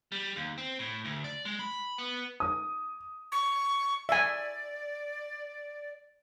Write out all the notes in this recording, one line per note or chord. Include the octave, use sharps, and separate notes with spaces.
G3
D#2
C4
A2
D2
D5
G#3
B5
B3
D#6
C#6
D5 E5 G#5